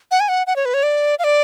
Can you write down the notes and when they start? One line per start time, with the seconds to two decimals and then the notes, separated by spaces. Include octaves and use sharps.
0.11 F#5
0.20 G#5
0.29 F#5
0.47 F#5
0.56 C#5
0.65 B4
0.74 C#5
0.83 D5
1.19 F5
1.24 D5